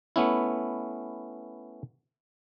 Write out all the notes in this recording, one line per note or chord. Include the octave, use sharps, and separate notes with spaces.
A3 B3 C#4 E4